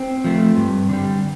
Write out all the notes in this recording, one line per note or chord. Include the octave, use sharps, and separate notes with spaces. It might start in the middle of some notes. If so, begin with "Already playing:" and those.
Already playing: C4
F3 A3
G2
D3 G3